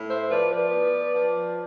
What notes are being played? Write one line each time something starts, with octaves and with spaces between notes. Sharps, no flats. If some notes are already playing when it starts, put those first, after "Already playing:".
Already playing: A2
C5 E5
F3 B4 D5
B4 D5
B3
F3